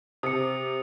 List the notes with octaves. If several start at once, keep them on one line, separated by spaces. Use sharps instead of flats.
C3 D#6 C#7